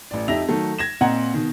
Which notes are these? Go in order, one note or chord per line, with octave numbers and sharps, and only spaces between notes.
A1 D5
F2 D#4 G4 E5 A#6 F7
D#3 F#3 A3 A4
G#6 A#6 E7
A#2 C4 D#5 F#5 A#5 G#6
B2 D#3